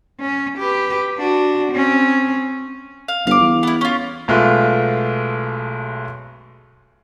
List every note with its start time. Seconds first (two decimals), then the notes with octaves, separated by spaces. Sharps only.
0.20 C#4
0.59 G4 B4
1.18 D4 F#4
1.73 C4 C#4
3.08 F5
3.27 G1 F5 D6
3.40 E2
3.63 B3 E4
3.81 C#4 F4
4.28 B1 G#3 A3 F4 B4